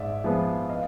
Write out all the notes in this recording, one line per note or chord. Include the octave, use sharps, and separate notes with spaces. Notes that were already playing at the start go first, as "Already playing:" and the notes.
Already playing: G#2 D5 E5
F3 G#3 B3
D#5 F5